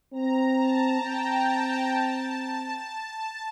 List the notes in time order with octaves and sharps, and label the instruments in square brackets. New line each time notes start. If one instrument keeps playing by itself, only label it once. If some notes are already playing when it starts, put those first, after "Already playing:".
[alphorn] C4 [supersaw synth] A#5
[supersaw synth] A5
[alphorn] C4 [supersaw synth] G5
[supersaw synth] A5
A5